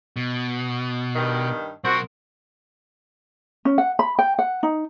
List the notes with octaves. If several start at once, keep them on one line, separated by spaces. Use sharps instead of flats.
B2
G2 D#3
B1 C4 F#4 A#4
C#4
F#5
B5
G5
F#5
D#4